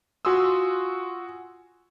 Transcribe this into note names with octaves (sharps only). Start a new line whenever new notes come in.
F4 F#4 G#5 C6 D#6 E6